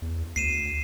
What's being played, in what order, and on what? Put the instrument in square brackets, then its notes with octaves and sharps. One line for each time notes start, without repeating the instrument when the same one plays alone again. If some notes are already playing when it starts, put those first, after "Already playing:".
[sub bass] E2
[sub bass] D2 [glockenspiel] C7 D#7 E7